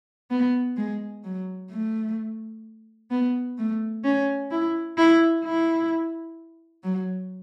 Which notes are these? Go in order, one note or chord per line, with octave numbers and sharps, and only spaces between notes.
B3
G#3
F#3
A3
B3
A3
C#4
E4
E4
E4
F#3